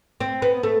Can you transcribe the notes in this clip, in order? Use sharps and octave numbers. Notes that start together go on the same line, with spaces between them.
C4
B3
A3